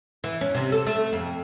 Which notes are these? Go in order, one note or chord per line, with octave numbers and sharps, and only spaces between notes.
E3
C#4
C3
A4
A3
F2